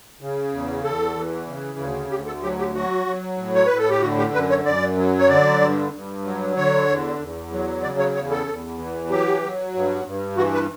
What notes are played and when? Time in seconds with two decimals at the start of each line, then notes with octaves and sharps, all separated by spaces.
0.21 C#3
0.52 E2
0.84 E2 A4
1.15 E3
1.47 C#3
1.79 D2
2.10 D2 G4
2.26 A4
2.43 F#3 G4
2.59 G4
2.74 F#3 F#4
3.06 F#3
3.37 A2
3.55 C#5
3.66 A2 B4
3.78 A4
3.90 G4
4.01 D3 F#4
4.18 G4
4.33 F#2 B4
4.50 C#5
4.65 F#2 D5
4.97 F#3
5.19 C#5
5.28 D3 D5
5.61 G2
5.92 G2
6.24 F#3
6.56 D3 C#5
6.88 E2
7.19 E2
7.52 F#3
7.83 C#3 D5
7.99 C#5
8.15 E2 C#5
8.31 A4
8.47 E2
8.78 E3
9.10 F#3 G4
9.41 F#3
9.74 G2
10.05 G2
10.37 E3 F#4
10.54 B4